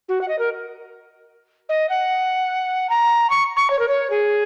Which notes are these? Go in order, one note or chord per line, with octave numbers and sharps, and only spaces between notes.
F#4
F#5
D#5
A#4
D#5
F#5
A#5
C#6
C#6
C#5
A#4
C#5
G#4